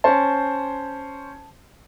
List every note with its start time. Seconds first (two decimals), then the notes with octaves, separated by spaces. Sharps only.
0.04 C#4 C5 A5